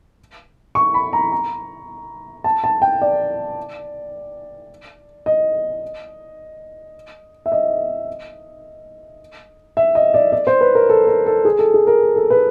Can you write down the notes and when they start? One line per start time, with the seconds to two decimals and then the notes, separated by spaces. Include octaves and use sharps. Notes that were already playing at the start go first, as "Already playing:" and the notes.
0.75 C#6
0.94 B5
1.13 A#5
1.32 A#5
2.44 A5
2.64 A5
2.82 G5
3.02 D5
5.26 D#5
7.46 E5
7.52 D#5
9.77 E5
9.95 D#5
10.14 D5
10.32 D5
10.47 C5
10.61 B4
10.75 A#4
10.89 A4
11.07 A#4
11.26 A4
11.45 G#4
11.59 A4
11.74 G#4
11.87 A#4
12.16 A4
12.30 B4